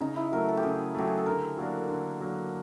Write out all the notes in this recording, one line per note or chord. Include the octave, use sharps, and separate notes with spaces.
C#3 D#4
E4
F#3 A3 A#4
A4
G4
C#3 G#4
F#3 A3 G4
G#4
A4
D3 A#4
F#3 A#3 D4
D3
F#3 A#3 D4